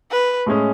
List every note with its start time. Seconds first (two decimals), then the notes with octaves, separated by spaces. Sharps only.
0.11 B4
0.46 A2 G#3 C#4 G#4